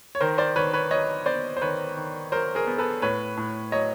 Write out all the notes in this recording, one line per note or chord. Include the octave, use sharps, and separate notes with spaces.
C#5
D#3 A#4 C5
C5 D5
D#3 B4 C#5
B4 C#5
F#3 C#5 D#5
B3 C5 D5
C5
D#3 B4 C#5
D#3
F#3 A#4 C5
G#4 A#4
B3
A4 B4
A2 B4 C#5
A2
F#3 C#5 D#5